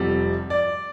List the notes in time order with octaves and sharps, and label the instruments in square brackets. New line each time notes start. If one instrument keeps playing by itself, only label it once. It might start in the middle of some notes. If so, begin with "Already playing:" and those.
Already playing: [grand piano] F1 F2 C3 G3 C4
D5